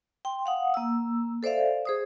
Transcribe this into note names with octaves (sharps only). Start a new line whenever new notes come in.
G5 C6
F5 F#5 D#6
A#3 E6
A4 C5 D5 E5 F5
G#4 C5 D#6